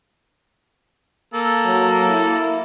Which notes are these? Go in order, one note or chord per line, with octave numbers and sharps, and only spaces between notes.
A#3 A4
F#3
E4